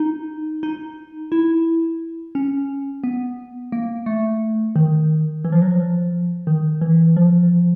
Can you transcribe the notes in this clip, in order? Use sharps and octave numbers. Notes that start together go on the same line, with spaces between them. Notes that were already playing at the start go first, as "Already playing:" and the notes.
Already playing: D#4
D#4
E4
C#4
B3
A#3
A3
D#3
E3
F3
F#3
F3
D#3
E3
F3